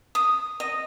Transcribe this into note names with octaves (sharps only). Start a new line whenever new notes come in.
D#6
D#5